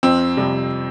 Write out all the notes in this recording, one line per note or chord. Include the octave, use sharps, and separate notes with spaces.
F2 C4
C3 G3